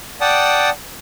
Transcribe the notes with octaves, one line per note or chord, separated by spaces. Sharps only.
D5 F#5 G5 A5 D#6